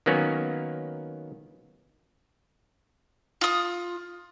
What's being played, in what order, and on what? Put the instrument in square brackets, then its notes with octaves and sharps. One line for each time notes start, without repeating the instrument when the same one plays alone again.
[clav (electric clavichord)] D#3 F#3 A#3 B3 C#4
[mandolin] F4 D#6